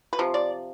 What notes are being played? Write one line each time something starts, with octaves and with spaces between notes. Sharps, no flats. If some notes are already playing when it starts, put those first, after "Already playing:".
B4
C3 F3
D5